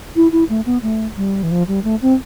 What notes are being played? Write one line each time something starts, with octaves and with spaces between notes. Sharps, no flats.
E4
E4
A3
B3
A3
G3
E3
F3
G3
A3
C4